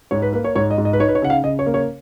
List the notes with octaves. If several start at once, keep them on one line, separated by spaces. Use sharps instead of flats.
G#2 C#5
B4
A#3 B4
C#5
G#2 C#5
D#5
G#2
D#5
B4
D#4 C#5
B4
C#5
C#3 F#5
F5
C#3 D#5
C#5
A#3
C#5